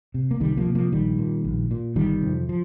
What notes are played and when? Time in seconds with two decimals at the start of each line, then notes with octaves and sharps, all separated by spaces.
0.14 C3
0.31 A#3
0.40 C2 D#3 G3
0.57 F3 A#3
0.66 C3
0.75 F3 A#3
0.92 A#1 D#3 G3
1.18 A#2
1.45 A#1
1.71 A#2
1.96 G1 D#3 G3
2.22 F2 C3
2.49 F3